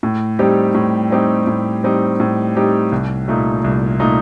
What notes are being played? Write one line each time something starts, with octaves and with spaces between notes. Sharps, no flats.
A2
G3 C4 D#4 G4
A2
G3 C4 D#4 G4
A2
G3 C4 D#4 G4
A2
G3 C4 D#4 G4
C2
A#2 A3 D#4
C2
A#2 A3 D#4